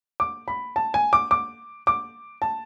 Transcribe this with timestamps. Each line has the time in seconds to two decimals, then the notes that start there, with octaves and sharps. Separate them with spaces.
0.20 D6
0.48 B5
0.76 A5
0.94 G#5
1.13 D6
1.31 D6
1.87 D6
2.42 A5